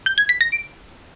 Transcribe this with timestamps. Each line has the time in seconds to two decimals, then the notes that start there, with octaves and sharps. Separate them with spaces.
0.06 G6
0.18 G#6
0.29 B6
0.41 A#6
0.52 D7